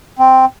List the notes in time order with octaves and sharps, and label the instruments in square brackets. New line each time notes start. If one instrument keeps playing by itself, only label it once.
[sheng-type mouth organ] C4